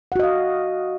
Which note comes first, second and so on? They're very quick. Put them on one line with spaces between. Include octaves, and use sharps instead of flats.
F#5 F#4 D#5 F5